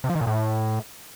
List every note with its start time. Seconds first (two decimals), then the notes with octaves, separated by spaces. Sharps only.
0.04 C3
0.10 F3
0.15 D#3
0.21 A#2
0.27 A2